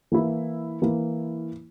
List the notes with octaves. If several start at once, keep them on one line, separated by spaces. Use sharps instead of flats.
E3 A#3 E4
E3 A#3 E4